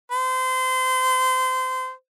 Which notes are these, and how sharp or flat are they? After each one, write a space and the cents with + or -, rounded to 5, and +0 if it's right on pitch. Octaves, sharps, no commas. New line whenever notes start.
C5 -25